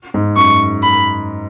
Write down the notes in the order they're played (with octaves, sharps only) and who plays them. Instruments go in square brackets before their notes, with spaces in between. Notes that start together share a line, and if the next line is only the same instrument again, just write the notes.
[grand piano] G#2
[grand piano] F#2 [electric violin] C#6
[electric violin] B5